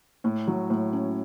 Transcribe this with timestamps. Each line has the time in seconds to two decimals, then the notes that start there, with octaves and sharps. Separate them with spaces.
0.24 A2
0.47 F#3
0.70 A2
0.93 C#4